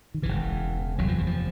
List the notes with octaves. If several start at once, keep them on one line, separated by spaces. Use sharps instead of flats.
D#3
D#2 C#3 E3
E1
F#1 E2 C3 F#3
F3
E3
F3